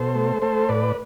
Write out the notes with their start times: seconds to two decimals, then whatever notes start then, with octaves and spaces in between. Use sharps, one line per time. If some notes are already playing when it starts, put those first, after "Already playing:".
Already playing: B2 A4 C5
0.15 A3
0.42 A3 A4 C5
0.69 A2 B4 D5